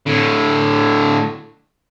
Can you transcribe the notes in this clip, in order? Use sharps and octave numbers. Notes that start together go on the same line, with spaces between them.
A2 D3